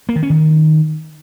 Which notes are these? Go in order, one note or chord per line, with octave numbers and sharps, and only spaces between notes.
A#3
D#3
C#4
D#3